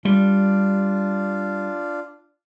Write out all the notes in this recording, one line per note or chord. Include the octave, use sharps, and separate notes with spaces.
G3 D4 F4